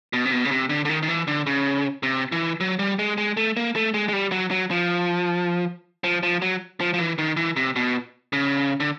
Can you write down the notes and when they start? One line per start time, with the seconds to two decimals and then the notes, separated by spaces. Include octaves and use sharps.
0.13 B2
0.25 C3
0.32 B2
0.45 C#3
0.51 C3
0.69 D3
0.85 D3
0.89 D#3
1.03 D#3
1.09 E3
1.27 D3
1.46 C#3
2.03 C3
2.32 E3
2.60 F#3
2.79 G3
2.99 G#3
3.18 G#3
3.37 A3
3.57 A#3
3.75 A3
3.94 G#3
4.09 G#3
4.13 G3
4.32 F#3
4.51 F#3
4.71 F3
6.04 F3
6.23 F3
6.42 F#3
6.80 F3
6.94 F3
6.99 E3
7.18 D#3
7.37 E3
7.56 C3
7.76 B2
8.33 C#3
8.80 D3